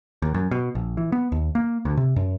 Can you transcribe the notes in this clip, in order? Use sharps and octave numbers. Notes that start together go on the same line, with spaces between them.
D#2
F#2
B2
A#1
E3
B3
D#2
A#3
D2
C3
F#2